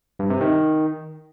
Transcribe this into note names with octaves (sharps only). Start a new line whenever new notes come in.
G2
C3
D#3